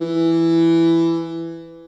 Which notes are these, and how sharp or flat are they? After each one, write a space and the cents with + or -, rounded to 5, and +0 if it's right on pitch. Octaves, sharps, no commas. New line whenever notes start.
E3 +10